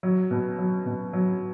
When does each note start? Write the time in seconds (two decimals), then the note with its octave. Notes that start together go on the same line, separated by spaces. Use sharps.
0.03 F#3
0.31 B2
0.58 F#3
0.86 B2
1.13 F#3